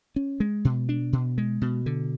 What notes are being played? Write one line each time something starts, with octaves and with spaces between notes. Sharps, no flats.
C#4
G#3
B2
D4
B2
G#3
B2
D3